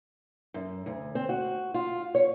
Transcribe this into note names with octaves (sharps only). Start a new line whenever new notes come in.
F#2
D2
C4
F#4
F4
C#5